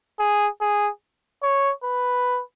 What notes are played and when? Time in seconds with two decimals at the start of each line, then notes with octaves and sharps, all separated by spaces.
0.19 G#4
0.61 G#4
1.43 C#5
1.83 B4